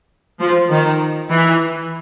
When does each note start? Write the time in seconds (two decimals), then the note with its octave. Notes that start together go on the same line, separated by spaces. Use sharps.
0.40 F3
0.70 D#3
1.30 E3